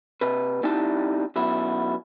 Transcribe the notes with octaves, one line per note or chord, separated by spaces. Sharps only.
C3 B4
G3 C4 D#4 E4 A5
F#2 B2 E4